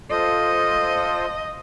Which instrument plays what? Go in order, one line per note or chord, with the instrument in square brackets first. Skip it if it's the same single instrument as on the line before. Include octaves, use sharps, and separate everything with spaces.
[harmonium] F4 A4 C5 [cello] D#5